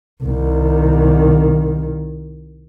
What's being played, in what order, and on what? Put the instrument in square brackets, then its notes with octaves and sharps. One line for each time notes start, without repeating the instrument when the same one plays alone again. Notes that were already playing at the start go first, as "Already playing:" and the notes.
[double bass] C2 D#3